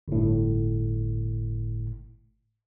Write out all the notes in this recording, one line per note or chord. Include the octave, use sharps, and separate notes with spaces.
G1 A2